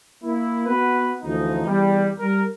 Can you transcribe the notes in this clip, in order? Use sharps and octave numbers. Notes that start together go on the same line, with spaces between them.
A#3 E4
B3 F#4 B4
D2 E3 F3 D#4
E2 G3
G3 A#4